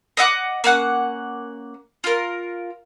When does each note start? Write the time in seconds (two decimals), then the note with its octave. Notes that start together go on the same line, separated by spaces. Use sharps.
0.17 D#5 E5 F#5 D6
0.64 A#3 C#4 F#5
2.04 F4 A#4